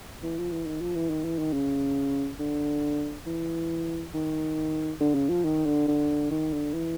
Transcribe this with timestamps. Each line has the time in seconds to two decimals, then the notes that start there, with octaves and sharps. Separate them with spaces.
0.23 E3
0.38 F3
0.51 E3
0.66 D#3
0.81 F3
0.95 E3
1.10 D#3
1.24 E3
1.38 D#3
1.53 C#3
2.39 D3
3.26 E3
4.14 D#3
5.00 D3
5.15 C#3
5.29 F3
5.44 D#3
5.66 D3
5.88 D3
6.31 D#3
6.53 D3
6.74 E3